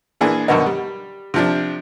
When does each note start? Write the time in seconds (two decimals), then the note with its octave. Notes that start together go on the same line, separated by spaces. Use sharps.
0.21 A#2 E3 D4 G#4
0.48 F#2 B2 D3 D#3 B3 D#4
0.66 G3
1.34 C3 F3 D4